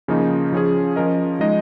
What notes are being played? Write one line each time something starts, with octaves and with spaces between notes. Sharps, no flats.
C#3 F3 A#3 D#4
F3 C#4 G#4
F3 C#4 A#4 D#5
F3 G#3 D#4 G#4 D#5